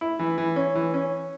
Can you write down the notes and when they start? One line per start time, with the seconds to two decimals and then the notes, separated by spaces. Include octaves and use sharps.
0.01 E4
0.19 E3
0.38 E3
0.56 C#4
0.75 E3
0.94 C#4